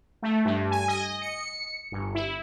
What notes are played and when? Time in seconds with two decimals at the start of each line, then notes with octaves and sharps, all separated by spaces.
0.22 A3
0.45 G2
0.71 G#5
0.88 D#5
1.22 C#7
1.92 G1
2.15 E4